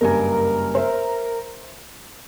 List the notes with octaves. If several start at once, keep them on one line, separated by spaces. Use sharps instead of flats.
F#1 G2 A#4 G#5
C5 E5